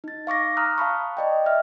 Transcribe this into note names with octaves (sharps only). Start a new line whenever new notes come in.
D#4 A6
F5 C#6 D6 A#6
A#5 D#6 F6 F#6
F5 A5 B5 C#6
D5 D#5 G5
E5 F6